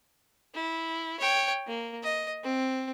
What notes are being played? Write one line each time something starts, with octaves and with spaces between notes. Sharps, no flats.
E4
C#5 G5
A#3
D#5
C4